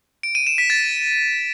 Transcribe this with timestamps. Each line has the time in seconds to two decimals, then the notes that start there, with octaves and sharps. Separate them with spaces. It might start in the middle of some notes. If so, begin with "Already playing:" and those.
0.23 D7
0.35 D#7
0.47 E7
0.58 B6
0.70 A6